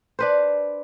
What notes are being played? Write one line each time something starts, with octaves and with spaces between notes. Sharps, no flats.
D4 B4 C5